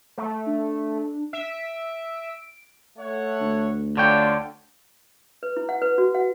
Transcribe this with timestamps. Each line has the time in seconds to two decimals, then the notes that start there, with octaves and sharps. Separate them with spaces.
0.18 A3
0.46 D4
1.33 E5 D7
2.98 A3 C#5 F#5
3.40 D2
3.97 D3 D4 F4 C#5 G5
5.43 B4
5.57 E4
5.69 F#5
5.82 B4
5.98 F#4
6.15 F#5